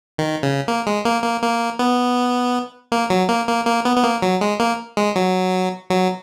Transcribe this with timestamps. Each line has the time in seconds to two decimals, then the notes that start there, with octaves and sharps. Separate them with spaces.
0.18 D#3
0.43 C#3
0.68 A#3
0.87 G#3
1.05 A#3
1.24 A#3
1.43 A#3
1.79 B3
2.92 A#3
3.10 F#3
3.29 A#3
3.48 A#3
3.67 A#3
3.85 B3
3.96 B3
4.04 A#3
4.22 F#3
4.41 G#3
4.60 A#3
4.97 G#3
5.16 F#3
5.90 F#3